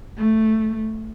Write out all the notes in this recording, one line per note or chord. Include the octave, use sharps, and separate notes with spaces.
A3